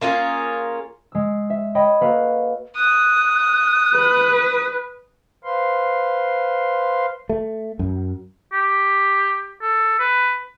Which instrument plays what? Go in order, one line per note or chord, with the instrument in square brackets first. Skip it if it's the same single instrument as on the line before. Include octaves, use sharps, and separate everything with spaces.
[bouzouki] A#3 C#4 F4 G#4
[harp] G#3 E6
E5
C#5 D#5 G5 B5
A#3 F#4 A4 B4 F5
[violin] D#6 [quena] F#6
[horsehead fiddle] B4
[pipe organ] B4 C5 F5 C6
[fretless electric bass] A3
F#2
[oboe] G4
A4
B4